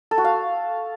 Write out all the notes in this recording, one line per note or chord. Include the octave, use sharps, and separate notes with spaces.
A4
F#4
F5